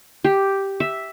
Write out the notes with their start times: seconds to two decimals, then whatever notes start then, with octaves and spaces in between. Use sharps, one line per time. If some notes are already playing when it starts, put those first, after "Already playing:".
0.24 G4
0.80 E5